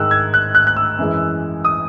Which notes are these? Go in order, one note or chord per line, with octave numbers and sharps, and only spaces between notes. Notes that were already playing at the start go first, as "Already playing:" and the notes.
Already playing: G#2 D#3 G#3 E6 F#6
G#6
F#6
F#6
F#6
E6
F#2 E3 G#3
D#6